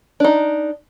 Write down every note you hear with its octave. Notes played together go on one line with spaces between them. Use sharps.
D4 D#4